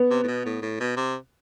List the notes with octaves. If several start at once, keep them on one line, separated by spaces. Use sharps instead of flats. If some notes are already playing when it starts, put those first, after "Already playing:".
Already playing: B3
C3
A2
B2
A2
A2
B2
C3